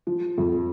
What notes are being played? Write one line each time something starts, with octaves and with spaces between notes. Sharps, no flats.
F3
F2